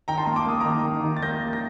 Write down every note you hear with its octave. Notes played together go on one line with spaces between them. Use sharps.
D#3 G5 A#5
A5 C6
A#3
D6
A#3 D#6
D#3 A#5 D6
D#3
D#3
A6
A#3 G6 A#6
A#3
A#6